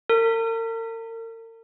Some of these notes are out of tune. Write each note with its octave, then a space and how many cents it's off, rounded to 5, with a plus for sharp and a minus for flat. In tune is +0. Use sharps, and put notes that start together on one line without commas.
A#4 -45